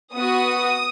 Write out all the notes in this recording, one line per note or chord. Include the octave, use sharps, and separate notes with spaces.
B3 F#4 D#6